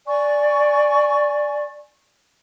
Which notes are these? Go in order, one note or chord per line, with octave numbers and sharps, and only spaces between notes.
D5 G#5 C#6